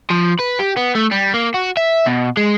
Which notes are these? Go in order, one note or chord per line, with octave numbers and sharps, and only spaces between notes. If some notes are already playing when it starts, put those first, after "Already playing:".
F3
B4
G4
B3
A3
G3
A#3
F#4
E5
B2
G#3